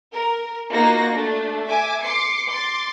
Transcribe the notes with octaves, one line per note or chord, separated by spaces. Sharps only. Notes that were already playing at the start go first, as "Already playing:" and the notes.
A#4
A#3 D#4 F4 F#4 A#6
A3 D4
E5 G#5 D6
C6 D6 C7 C#7
C6 D6 A6